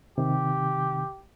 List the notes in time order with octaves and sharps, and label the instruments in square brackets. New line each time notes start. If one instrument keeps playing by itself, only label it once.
[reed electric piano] C3 D#3 [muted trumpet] G4